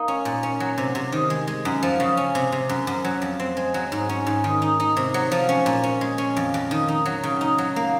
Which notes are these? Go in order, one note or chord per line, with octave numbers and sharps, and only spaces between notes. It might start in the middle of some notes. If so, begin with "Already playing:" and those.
Already playing: A#3 D#4
C#4
A#2
C#4
F#3
C3
C3
D#3
G#3
G#3
F#2
F3
C#3
C#4
C3
C3
F#2
F#2
F#3
F2
C4
G#3
F#3
G#2
C#4
G#2
D#3
D#4
D#4
C3
F#3
F3
C#4
A#2
C#4
G#3
C#4
F2
F2
D#3
D#4
F#3
C#3
D#4
F#3
A#3